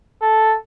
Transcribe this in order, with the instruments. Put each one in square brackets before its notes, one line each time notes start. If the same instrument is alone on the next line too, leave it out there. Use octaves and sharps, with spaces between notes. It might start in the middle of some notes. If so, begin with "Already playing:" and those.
[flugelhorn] A4